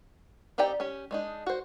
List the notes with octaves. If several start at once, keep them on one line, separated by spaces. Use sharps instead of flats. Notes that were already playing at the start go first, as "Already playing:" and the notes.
C4 D#4 G4 D5 G5
C#4 G4
G#3 D4 D#4
F#4 C5